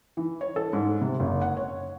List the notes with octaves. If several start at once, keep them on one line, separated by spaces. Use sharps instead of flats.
E3
C#5
A4
G#2
C3
F#1
F#5
C#5